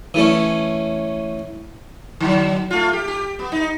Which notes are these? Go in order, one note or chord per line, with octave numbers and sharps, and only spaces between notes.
E3 A3 C#4
D3 F#3
A3 F4
G4
G4
B3
D#4